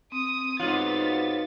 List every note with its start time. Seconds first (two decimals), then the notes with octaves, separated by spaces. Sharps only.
0.12 C4 D#6 D#7
0.59 G#2 B3 D#4 F4 F#4 C#5 A6